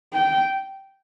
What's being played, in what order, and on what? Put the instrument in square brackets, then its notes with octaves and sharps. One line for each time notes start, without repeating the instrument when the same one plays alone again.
[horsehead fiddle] G5